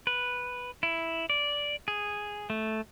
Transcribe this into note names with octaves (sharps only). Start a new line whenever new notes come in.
B4
E4
D5
G#4
A3